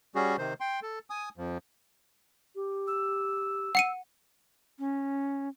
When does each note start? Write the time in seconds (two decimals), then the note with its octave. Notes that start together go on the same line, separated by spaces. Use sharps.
0.15 G3 C#4 F#4 G#4
0.38 C3 D#3 C5
0.60 G5 C6
0.82 A4
1.10 G#5 D#6
1.38 F2 F3
2.55 G4
2.87 E6
3.75 F#5 C#7 D#7
4.79 C#4